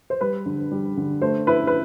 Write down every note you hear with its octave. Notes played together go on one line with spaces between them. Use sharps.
C5
G3 B4
D3
G3
D3
A3 C5
E4 B4
B4